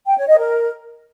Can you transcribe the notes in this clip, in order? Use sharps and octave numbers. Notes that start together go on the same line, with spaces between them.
G5
C#5
D#5
A#4